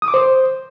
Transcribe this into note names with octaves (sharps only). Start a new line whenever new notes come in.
D#6
D6
C5